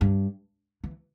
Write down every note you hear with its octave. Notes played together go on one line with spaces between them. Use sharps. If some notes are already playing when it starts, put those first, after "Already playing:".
G2
E3